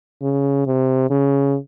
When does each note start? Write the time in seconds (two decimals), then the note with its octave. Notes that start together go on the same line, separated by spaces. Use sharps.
0.22 C#3
0.67 C3
1.10 C#3